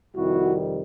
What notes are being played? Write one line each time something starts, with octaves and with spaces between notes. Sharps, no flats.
F2 C3 D#3 G3 E4 F#4